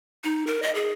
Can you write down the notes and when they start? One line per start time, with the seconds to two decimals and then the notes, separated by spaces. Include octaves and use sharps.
0.24 D#4
0.47 A#4
0.63 D#5
0.75 G#4